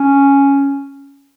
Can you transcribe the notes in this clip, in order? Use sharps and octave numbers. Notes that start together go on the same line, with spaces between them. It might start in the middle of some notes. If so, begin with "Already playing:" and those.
Already playing: C#4